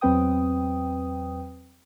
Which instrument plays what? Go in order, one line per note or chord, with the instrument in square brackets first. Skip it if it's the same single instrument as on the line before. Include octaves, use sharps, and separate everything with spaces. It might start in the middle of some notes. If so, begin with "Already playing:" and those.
[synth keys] E2 F#3 C4 B4 G5 D#6